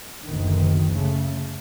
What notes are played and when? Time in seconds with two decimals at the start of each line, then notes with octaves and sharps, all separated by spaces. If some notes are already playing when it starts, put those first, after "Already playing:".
0.24 F#1 D2 B2 D#3
0.92 C#3 A3